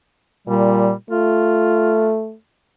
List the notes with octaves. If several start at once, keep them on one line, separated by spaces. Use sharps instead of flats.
A#2 G3
A3 F4